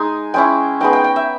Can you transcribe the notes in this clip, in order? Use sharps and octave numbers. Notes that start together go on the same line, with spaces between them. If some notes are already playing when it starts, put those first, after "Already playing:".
Already playing: G#3 D#4 G#5
G#3 C#4 E4 G5
G#3 B3 D#4 G5
G5
G5
E5